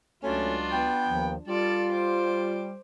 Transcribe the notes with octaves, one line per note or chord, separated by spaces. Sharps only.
C#2 F#3 A3 C#4 D4 F4 F#4
B3 G5
D#2 D#3 F3
G3 F4 A4 D5
C5 D6